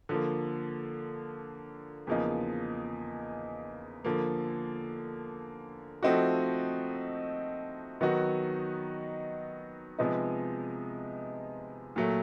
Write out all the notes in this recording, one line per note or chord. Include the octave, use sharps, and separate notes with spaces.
D3 F3 A#3
E2 C#3 F3 A#3 D#4
D3 F3 A#3
F3 A3 C4 D#4 F#4
D#3 F#3 B3 D#4 F#4
C3 F3 G#3 B3 D#4
A#2 F#3 A3